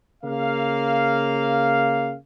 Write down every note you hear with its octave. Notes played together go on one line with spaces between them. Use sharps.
C#3 A#3 F5